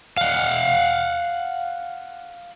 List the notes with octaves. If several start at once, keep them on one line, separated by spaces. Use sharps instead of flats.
F5 F#5